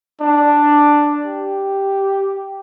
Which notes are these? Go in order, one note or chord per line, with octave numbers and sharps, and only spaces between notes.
D4
G4